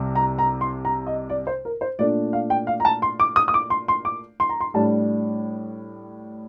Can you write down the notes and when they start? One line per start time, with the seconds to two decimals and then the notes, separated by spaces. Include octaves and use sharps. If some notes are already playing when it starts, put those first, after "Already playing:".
Already playing: C2 C3 C4
0.15 A#5
0.39 A#5
0.61 C6
0.85 A#5
1.06 D#5
1.30 D5
1.47 C5
1.65 A#4
1.81 C5
1.99 A#2 A3 D4 D5
2.33 F5
2.50 G5
2.67 F5
2.80 A#5
2.85 A5
3.02 C6
3.20 D6
3.36 D#6
3.48 D#6
3.54 D6
3.70 C6
3.88 C6
4.05 D6
4.40 C6
4.49 A#5
4.61 C6
4.74 A2 G3 D4 A5